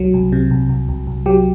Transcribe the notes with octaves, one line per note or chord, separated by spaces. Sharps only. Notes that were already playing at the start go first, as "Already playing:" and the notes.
Already playing: C2 F#3
C2
C3
C2
C2
C2
C2
F#3 G4